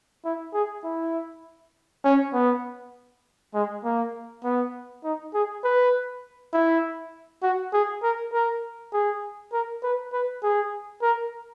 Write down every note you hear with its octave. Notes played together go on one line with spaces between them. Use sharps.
E4
G#4
E4
C#4
B3
G#3
A#3
B3
D#4
G#4
B4
E4
F#4
G#4
A#4
A#4
G#4
A#4
B4
B4
G#4
A#4